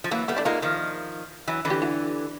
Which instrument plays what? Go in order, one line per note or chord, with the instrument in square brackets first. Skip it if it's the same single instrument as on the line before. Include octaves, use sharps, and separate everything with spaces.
[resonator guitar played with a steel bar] F3
[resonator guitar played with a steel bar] E3 F#3 [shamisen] A#3
[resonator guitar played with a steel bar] G3 A3 [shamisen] B3
[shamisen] D4 E4
[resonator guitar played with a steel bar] G#3 A#3 [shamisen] D#4 F4
[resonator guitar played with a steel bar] D#3 F3
E3 F#3
D3 E3
[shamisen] G4
E4 F#4